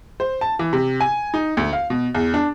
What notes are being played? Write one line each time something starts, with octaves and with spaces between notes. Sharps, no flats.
C5
A5
E3
C3
G#5
D#4
D2
F5
B2
E2
D4